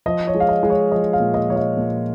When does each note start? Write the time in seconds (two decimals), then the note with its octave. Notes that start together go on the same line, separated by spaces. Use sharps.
0.06 F3 D#5
0.27 C#5
0.34 G#3
0.40 F5
0.49 D#5
0.63 G#3
0.70 C#5
0.92 F3 D#5
1.13 F5
1.20 A#2
1.34 D#5
1.48 F3 C#5
1.56 D#5
1.77 A#2